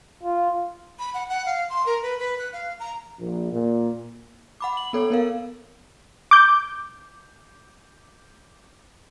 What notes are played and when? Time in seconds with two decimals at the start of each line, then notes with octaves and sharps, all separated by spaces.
0.23 F4
0.99 B5
1.14 F#5
1.29 F#5
1.46 F5
1.70 C6
1.86 A#4
2.02 B4
2.19 B4
2.39 F#6
2.53 F5
2.80 A#5
3.19 A#1
3.51 A#2
4.60 F#5 B5 D6
4.77 F#7
4.93 B3 A4 C#5
5.10 B3 A#4 F5
6.31 D6 G6